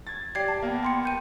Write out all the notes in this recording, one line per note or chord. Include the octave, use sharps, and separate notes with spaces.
G#6 A6
G4 D5 G#6 C7
A5
A#3 B3
G5 C6 C#7
G5 G6 D#7